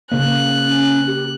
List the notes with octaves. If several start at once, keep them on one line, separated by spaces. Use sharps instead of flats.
C#3 A#3 F#6
C#4
G4